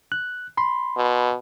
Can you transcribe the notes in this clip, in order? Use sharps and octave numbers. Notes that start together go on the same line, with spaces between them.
F#6
B5 C6
B2